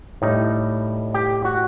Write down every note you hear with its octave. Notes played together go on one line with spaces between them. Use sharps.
A2 G3 D#4
G4
F#4 F#5